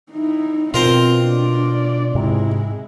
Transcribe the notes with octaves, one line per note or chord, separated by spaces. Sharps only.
D#4 E4
B2 C4 F4 A#4 C5
D4 D5
G#2 C3 G#3 E4